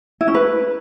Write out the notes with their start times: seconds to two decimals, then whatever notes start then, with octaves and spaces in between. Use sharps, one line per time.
0.21 E4
0.28 C#4
0.34 B4